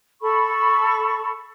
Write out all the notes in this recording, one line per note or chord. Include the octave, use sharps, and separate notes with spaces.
A4 B5 C#6